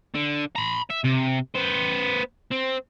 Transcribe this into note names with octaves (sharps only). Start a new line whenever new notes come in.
D3
A#5 B5
E5
C3
B3 C5
C4